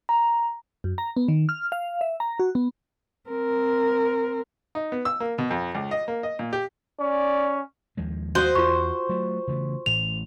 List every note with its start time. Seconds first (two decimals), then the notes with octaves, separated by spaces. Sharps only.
0.09 A#5
0.84 F#2
0.98 A#5
1.17 B3
1.28 D#3
1.49 F6
1.72 F5
2.01 E5
2.20 A#5
2.40 F#4
2.55 B3
3.29 C4 A#4
4.75 D#4
4.92 B3
5.05 E6
5.20 A#3
5.38 B2
5.51 F2
5.75 C#2
5.91 D#5
6.08 A#3
6.23 D#5
6.39 A#2
6.53 G4
7.00 C#4 D5
7.97 D#2 F3 G#3
8.35 F#4 C5 D#5
8.55 E2 F4 C#6
9.09 F#3 A3
9.47 C#3 E3 A3
9.86 A1 A2 E3 F7